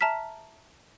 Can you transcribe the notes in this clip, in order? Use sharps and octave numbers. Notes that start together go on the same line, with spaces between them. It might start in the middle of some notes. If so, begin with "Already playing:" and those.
E5 A5 A#5 F6 B6